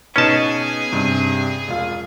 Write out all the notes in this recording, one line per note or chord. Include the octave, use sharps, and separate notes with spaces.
B2 C#4 D#4 G#4 B4 G#5 A5
G2 C3
E1 F4